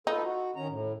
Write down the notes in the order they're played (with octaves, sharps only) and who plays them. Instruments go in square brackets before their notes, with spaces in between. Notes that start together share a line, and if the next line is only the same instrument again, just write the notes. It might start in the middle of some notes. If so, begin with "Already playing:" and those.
[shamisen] D#4 [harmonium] F4 A4 B4
[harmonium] F#4
D#3 C#4 A#5
A2